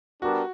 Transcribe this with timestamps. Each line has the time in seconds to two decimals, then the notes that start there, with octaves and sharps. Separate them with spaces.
0.22 G3 B3 D4 F#4 G4 A#4